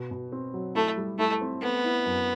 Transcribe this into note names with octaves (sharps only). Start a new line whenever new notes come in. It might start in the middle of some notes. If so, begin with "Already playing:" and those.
Already playing: B2
B2
C4
F#3
A3 E4
G3
A3 E4
C4
A3 B3
E4
F#2